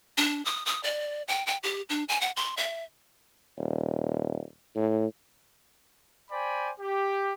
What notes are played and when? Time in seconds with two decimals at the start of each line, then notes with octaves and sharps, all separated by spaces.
0.18 D4
0.45 D#6
0.66 D#6
0.84 D5
1.28 G5
1.47 G5
1.63 G4
1.89 D4
2.09 G#5
2.21 F#5
2.37 C6
2.57 E5
3.58 D#1
4.76 A2
6.31 C5 D5 G5 G#5 B5
6.80 G4